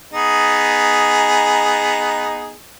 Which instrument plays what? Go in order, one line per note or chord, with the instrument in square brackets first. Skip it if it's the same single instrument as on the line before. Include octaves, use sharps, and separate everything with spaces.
[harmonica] B3 D#4 G#4